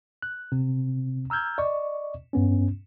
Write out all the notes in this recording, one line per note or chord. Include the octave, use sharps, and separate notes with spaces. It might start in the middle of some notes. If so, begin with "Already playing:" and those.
F#6
C3 C4
A#5 E6 F6 G6 G#6
D5 D#5 C#6
G2 B3 C#4